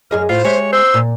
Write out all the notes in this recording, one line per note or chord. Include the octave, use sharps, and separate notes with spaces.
F#2 G#4 D#5 F6
A2 F4 C5
G#3 G4 C#5 E5
C5 E6
A#2